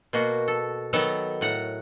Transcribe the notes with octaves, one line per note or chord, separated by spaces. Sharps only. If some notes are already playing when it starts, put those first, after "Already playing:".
B2 A#3 F#4
A4
D#3 F#3 B3 A4 A5 A#5
A2 F#5 A#5